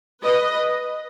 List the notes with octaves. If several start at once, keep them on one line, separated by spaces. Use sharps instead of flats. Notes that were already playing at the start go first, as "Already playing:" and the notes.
B4 D#5